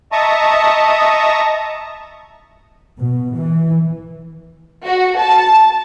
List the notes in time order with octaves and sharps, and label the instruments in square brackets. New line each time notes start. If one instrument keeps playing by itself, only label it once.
[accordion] D#5 E5 A5 A#5 C#6 D#6
[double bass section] B2
E3
[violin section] F#4
A5